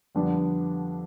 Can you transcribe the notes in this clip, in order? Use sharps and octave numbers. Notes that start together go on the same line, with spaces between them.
F2 D3 G3 B3 D4